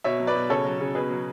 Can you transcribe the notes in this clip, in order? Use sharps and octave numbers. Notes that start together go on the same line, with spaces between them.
B2 C#5 E5
F#3
B4 D5
B2
C#3 A4 C#5
F#3
C#3
B2 G#4 B4
F#3